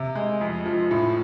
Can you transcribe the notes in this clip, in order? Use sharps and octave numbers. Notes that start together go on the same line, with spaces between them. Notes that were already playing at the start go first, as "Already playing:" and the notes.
Already playing: C3
G#3
F2
F3
A2